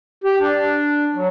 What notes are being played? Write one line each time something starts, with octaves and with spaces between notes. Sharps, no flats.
G4
D4
F#3